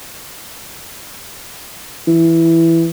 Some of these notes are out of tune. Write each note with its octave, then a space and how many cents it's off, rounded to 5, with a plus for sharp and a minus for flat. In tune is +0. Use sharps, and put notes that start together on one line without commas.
E3 +5